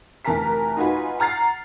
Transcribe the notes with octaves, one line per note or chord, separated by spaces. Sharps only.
F1 E3 A#4 A5 A#5 B6
D#4 F4 F#4 B4 G#5 B5
F#5 A#5 F6 A6 C7